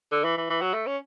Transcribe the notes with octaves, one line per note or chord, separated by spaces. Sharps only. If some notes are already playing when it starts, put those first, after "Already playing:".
D3
E3
E3
E3
F#3
A3
C#4